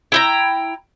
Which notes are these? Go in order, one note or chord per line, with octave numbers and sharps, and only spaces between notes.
E4 G5 A#5